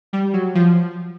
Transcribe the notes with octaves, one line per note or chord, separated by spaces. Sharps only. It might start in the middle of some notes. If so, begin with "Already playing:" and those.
G3
F#3
F3